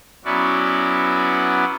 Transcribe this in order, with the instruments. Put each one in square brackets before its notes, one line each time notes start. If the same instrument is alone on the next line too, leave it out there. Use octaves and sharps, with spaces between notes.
[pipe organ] F#3 B3 C#4 E4 F#4 D5